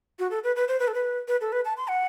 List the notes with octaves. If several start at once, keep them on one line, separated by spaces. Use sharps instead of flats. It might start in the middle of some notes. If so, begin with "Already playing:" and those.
F#4
A4
B4
B4
C5
B4
A4
B4
B4
A4
B4
A5
C6
F#5